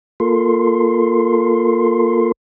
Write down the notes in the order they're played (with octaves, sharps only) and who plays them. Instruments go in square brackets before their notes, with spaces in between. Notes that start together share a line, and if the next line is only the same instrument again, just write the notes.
[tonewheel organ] A#3 F4 A4 A#4 C6